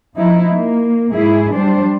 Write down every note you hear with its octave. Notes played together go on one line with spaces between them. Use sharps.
F3 D#4 E4
A#3
G#2 E4 G#4
G3 D4 C5